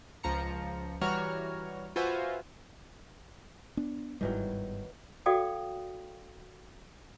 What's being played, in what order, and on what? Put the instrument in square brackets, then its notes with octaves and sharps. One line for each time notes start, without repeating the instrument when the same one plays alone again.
[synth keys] C#2 F3 A#5 C#7
E3 G3 F#4 C#5 A#5 F6
F4 F#4 B4 C5 E5 G#5
[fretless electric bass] B3 D4
[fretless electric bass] G1 G#2 G3 [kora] D#3 E3 F#3
[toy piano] F#4 A4 D5 F5 G5 D#6